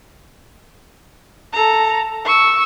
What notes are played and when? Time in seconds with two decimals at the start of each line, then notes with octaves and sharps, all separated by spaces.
1.53 A4 A#5
2.25 C#6 E6